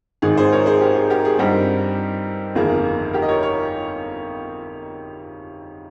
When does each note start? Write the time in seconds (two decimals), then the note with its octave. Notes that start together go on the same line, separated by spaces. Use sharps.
0.22 G#1 G#2 D#3 G#4
0.37 G#4 C5
0.52 A#4 C#5
0.66 G#4 C5
0.81 G4 A#4
0.96 G#4
1.10 G4 A#4
1.25 G#4
1.39 G2 G3 C4 D#4 G4 A#4
2.55 G1 F2 D#3 A#3 G#4
3.13 G4 A#4
3.22 D#5
3.28 A#4 C#5
3.43 A#4 C#5